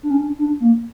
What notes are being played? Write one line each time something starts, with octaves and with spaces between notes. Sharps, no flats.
D4
C#4
D4
D4
A#3